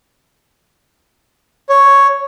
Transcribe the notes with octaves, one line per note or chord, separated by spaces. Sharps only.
C#5